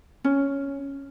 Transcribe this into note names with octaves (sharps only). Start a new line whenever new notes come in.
C#4